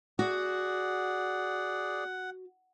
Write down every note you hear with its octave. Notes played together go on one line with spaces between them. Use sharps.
F#4 G#4 D5 F#5